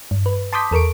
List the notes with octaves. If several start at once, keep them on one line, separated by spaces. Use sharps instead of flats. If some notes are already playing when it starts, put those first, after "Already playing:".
G2
B4
A5 C6 D6 D#6 G6 B6
E2 A4 A#4 C#6 D7